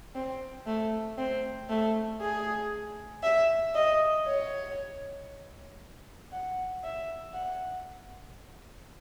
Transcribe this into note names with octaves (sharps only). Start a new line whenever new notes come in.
C4
A3
C4
A3
G#4
E5
D#5
C#5
F#5
E5
F#5